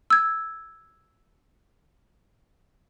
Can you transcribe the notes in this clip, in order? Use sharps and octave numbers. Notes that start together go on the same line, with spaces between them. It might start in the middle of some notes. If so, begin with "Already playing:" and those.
E6 G#6